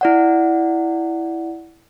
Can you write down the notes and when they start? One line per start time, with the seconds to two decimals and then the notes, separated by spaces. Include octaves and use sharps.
0.01 E4 D5 F#5